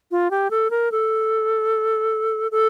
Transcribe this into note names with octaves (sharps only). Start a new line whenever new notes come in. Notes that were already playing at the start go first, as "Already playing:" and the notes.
F4
G4
A4
A#4
A4
A4